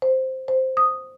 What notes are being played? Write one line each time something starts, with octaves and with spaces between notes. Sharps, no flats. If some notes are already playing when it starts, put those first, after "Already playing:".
C5
C5
D#6